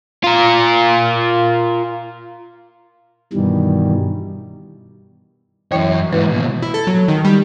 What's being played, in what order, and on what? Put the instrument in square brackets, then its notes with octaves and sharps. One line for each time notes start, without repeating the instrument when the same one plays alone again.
[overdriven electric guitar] F4 A#4
[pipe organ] G2 B2 D#3 E3 G3
[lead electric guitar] F#2 C#5 [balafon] E3 E4 G5
[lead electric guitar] G#2 E3 [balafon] B4
[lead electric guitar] D#2 B2
[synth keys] E4
A4
F#3
D#3
G3